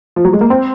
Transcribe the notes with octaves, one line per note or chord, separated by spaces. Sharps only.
F3
F#3
G#3
A#3
C4